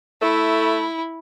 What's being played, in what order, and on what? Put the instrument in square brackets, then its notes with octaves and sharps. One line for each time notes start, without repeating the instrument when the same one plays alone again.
[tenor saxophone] A3 [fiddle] E4